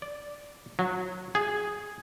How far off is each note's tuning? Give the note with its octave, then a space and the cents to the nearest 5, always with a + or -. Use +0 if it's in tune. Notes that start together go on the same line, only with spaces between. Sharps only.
D5 -5
F#3 -20
G#4 -5